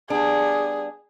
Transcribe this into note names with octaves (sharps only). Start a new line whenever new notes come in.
G3 B3 D4 G#4